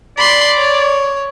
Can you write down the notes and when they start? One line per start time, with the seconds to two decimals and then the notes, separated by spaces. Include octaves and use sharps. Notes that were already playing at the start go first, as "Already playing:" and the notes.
0.18 D5 B5 C6
0.58 C#5